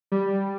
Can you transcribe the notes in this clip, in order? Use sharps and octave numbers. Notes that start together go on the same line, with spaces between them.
G3